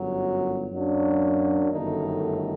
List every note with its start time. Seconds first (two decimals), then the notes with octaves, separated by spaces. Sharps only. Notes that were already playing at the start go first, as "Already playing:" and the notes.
Already playing: G1 F#2 F#3
0.71 F#2 F#3 A#3 D4
1.71 G1 F#2 D#3 A3 D#4